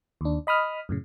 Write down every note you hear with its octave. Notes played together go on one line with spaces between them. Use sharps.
D#2 D4
D#5 B5 D#6 F6
F#2 A2 C#3